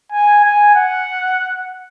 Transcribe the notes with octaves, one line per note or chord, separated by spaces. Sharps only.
G#5
G#5
F#5